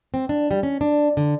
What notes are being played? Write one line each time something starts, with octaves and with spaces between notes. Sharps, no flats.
C4
D4
G3
C#4
D4
D3